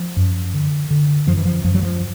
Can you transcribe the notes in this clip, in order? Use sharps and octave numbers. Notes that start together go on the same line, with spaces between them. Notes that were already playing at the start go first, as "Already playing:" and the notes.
Already playing: F3
F#2
D3
D3
F#2 F3
E3
F3
F#2 F3
F#3
F3